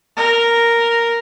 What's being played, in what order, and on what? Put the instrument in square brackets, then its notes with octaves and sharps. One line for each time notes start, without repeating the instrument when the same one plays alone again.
[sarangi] A#4